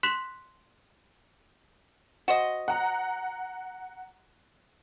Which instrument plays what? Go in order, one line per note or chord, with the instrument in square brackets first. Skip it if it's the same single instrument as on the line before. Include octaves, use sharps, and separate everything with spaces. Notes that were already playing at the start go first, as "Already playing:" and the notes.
[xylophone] C6 F#6 B6 E7 F#7
[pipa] F#4 C5 D#5
[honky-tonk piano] F#5 A#5